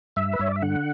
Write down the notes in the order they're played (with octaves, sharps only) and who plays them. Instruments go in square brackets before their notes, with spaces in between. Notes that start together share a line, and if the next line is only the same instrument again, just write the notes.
[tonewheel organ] G2 E5
B4
G2 C#5
D5
E5
D3 F#5